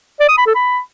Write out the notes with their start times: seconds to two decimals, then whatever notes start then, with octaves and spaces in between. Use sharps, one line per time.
0.20 D5
0.29 D#6
0.38 B5
0.46 A4
0.55 B5